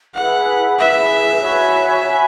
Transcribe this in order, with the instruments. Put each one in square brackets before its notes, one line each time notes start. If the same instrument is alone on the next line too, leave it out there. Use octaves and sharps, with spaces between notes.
[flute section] E4 G#4 B4 [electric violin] F#5
[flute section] E4 G#4 B4 [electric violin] E5
[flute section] F#4 C#5 G#5 B5
F#4 C#5 G#5 B5